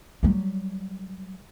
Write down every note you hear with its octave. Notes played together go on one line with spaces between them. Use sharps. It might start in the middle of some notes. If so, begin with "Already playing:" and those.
F#3 G3